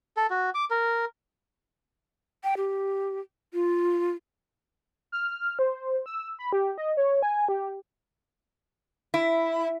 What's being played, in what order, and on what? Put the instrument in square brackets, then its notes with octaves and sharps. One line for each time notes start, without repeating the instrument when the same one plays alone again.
[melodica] A4
F#4
D6
A#4
[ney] G5
G4
F4
[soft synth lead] F6
C5
E6
B5
G4
D#5
C#5
G#5
G4
[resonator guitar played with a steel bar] E4